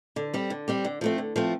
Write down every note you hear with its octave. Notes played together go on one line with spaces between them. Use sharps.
D3
G3 C4 G4
D3
G3 C4 G4
D3
F3 A3 C4
D3
F3 A3 C4